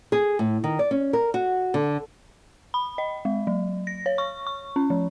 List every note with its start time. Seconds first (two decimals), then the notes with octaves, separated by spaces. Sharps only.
0.12 G#4
0.39 A2
0.64 D#3
0.79 D5
0.91 C#4
1.13 A#4
1.34 F#4
1.74 D3
2.74 B5
2.98 D#5
3.25 G#3
3.47 F#3
3.87 A#6
4.06 C#5
4.18 C#6
4.47 C#6
4.76 C#4
4.90 F3